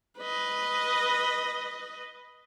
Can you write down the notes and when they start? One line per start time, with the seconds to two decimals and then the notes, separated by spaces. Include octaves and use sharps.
0.19 B4 D#5